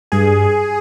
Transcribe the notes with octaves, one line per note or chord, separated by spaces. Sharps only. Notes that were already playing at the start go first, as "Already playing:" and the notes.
G2 G#4